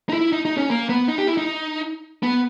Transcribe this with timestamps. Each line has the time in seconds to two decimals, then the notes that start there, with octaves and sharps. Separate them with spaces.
0.09 D#4
0.13 E4
0.32 D#4
0.45 D#4
0.57 C#4
0.70 A#3
0.89 B3
1.08 D#4
1.18 G4
1.27 E4
1.37 D#4
2.23 B3